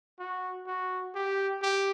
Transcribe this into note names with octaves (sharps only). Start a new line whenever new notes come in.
F#4
F#4
G4
G4